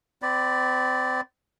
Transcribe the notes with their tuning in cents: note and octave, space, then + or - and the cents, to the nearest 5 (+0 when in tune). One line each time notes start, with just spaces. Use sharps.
C4 -30 D5 +0 B5 +0